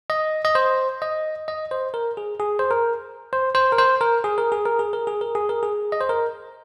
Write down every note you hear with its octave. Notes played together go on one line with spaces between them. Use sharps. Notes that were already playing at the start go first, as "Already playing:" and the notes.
D#5
D#5
C5
D#5
D#5
C5
A#4
G#4
G#4
C5
A#4
C5
C5
A#4
C5
A#4
G#4
A#4
G#4
A#4
G#4
A#4
G#4
A#4
G#4
A#4
G#4
D#5
C5
A#4